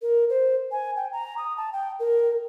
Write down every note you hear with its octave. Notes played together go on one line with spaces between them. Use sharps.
A#4
C5
G#5
G5
A#5
D#6
A5
G5
A#4